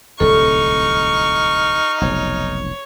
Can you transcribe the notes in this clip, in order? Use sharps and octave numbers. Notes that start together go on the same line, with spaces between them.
D1 C2 G3 D#4 A4 C#6 F6
F1 B1 C#5